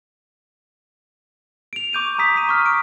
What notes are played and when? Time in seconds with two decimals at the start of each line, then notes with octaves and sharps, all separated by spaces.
1.73 D7 F7
1.93 C#6 D6 G6 D#7
2.19 A#5 D#6 B6
2.35 D#6 B6 D#7
2.49 C#6 F6
2.66 D7